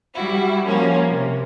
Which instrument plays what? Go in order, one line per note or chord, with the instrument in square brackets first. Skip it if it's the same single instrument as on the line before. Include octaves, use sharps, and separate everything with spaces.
[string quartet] G3 E4 F#4
F3 A#3 C#4
C3